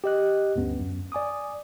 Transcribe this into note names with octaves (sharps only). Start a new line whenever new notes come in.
G4 D#5 F#6
D2 G2 B3 C#4
F#2
D5 G#5 D6 D#6